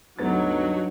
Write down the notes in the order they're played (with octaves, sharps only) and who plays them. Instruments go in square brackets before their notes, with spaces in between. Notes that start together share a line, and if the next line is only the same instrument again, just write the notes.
[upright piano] D2 B3 A6 [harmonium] G2 D#4 [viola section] F#3